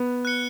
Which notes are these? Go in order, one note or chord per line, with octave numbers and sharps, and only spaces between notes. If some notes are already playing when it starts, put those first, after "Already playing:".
Already playing: B3
F#6 C#7 G7